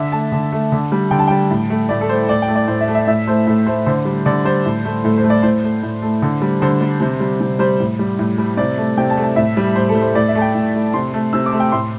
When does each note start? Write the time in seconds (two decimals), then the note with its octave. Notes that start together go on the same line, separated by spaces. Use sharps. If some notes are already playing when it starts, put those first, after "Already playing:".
Already playing: D3 E5
0.12 A3 A5
0.32 D3
0.52 A3
0.72 D3
0.92 G3
1.11 D3 G5
1.19 A5
1.28 G3 G5
1.50 A2
1.70 A3
1.89 A2 D5
2.01 A4
2.09 A3 C5
2.29 A2 D5
2.42 G5
2.48 A3
2.56 D5
2.68 A2 C5
2.81 E5
2.88 A3
2.95 E5
3.07 A2 E5
3.27 A3 C5
3.47 A2 A4
3.66 A3 C5
3.86 D3 C5
4.05 G3
4.26 D3 D5
4.45 G3 C5
4.65 A2
4.85 A3
5.04 A2 A4
5.18 C5
5.23 A3
5.30 D5
5.43 A2 C5
5.63 A3
5.83 A2
6.02 A3
6.22 D3
6.42 G3
6.62 D3 C5
6.81 G3
7.00 C3
7.20 G3
7.41 C3
7.59 G3 C5
7.80 A2
7.99 G3
8.19 A2
8.38 G3
8.57 C3 D5
8.77 A3
8.97 C3 G5
9.10 A5
9.17 A3
9.23 A5
9.36 A2 E5
9.57 G3
9.75 A2 C5
9.89 A4
9.95 G3
10.02 C5
10.15 A2 D5
10.28 E5
10.35 A3 A5
10.42 G5
10.55 A2
10.74 A3
10.94 C3 C6
11.14 A3
11.33 C3 E6
11.46 D6
11.53 A3
11.60 G5
11.72 A2 C6